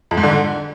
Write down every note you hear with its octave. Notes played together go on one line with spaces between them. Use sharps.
F2
G#2
D3